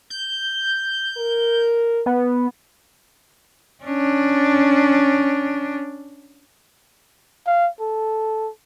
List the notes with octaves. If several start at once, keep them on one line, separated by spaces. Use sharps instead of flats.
G6
A#4
B3
C#4 D4
F5
A4